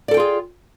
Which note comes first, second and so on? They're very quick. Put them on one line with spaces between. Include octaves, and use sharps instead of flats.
D5 A4 G5 F4 G#4